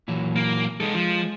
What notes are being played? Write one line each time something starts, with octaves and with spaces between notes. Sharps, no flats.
A#2 E3 F#3
A#3
G#3 D#4 A4
F3